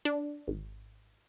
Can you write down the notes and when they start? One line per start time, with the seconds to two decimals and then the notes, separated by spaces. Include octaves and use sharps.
0.05 D4
0.48 G#1